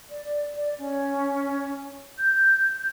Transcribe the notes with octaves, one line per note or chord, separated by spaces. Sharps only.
D5
D5
C#4
G6